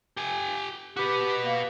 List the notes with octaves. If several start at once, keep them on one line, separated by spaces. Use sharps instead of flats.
G4 G#5
F#4 G4 B4
A#3